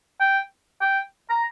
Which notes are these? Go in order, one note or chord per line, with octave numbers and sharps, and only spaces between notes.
G5
G5
A#5